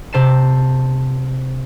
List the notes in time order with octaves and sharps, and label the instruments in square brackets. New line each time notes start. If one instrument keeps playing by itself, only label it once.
[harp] C3 C5 A5 C7 E7